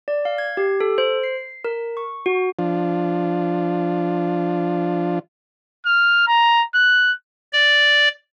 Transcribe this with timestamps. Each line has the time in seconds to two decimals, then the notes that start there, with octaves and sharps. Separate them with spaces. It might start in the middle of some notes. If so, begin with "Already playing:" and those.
0.08 D5
0.25 F5
0.38 G#6
0.57 G4
0.80 A4
0.98 C5
1.23 C7
1.65 A#4
1.97 C#6
2.26 F#4
2.59 F3 D4 F4
5.86 F6
6.28 A#5
6.75 F#6
7.53 D5